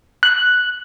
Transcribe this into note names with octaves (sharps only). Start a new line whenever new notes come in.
F#6